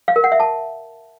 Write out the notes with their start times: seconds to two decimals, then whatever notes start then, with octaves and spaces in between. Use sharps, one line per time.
0.08 F5
0.16 A#4
0.24 F#5
0.32 E5
0.40 A5